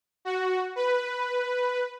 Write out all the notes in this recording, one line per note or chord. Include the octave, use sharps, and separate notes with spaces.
F#4
B4